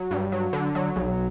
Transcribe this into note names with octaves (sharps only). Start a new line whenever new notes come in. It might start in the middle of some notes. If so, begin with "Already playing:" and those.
Already playing: F#3
G2
F#3
D3
F#3
B1